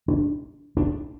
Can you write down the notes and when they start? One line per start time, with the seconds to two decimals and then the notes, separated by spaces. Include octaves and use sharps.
0.08 D4
0.77 D4